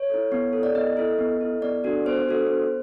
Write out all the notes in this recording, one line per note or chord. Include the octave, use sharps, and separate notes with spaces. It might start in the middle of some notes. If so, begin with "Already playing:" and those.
Already playing: C#5
E4 A4
B3
E4 A4
D5
B3 D#5
E4 A4
B3
E4 A4
B3 D5
D4 F#4 A4
B3 C5
D4 F#4 A4
B3